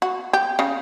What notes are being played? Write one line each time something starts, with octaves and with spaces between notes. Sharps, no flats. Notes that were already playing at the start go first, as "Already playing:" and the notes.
F#4
G4
C#3